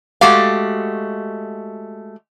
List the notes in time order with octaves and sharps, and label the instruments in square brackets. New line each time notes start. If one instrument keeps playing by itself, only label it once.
[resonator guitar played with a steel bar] G#3 A3 F#4 G4 F5